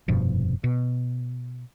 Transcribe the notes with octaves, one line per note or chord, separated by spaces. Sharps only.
F1 G2 B2 F3
B2